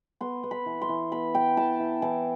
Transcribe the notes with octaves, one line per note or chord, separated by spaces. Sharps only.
B3 C6
B3
B5
E3
C6
E3
B3 B5
B3 G5
E3 A5
E3
E3 A5